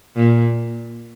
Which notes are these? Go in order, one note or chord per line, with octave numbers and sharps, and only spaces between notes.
A#2